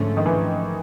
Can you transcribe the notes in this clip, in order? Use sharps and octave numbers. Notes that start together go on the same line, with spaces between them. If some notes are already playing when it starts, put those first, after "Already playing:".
Already playing: G#2 D3 F3 A3 C#4
D#3
E3